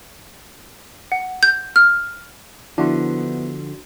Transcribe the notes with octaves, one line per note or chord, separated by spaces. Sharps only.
F#5
G6
F6
D3 F3 B3 D4 E4 F#4 C6